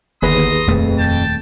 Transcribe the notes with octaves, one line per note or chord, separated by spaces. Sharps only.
G1 D#2 G#4 B4 A#5 C6 D#6
D#1 F2 A3
G5 A5